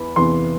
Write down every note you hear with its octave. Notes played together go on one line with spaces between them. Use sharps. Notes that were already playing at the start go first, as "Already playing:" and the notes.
Already playing: E2 E3 B5
E2 C3 E3 C6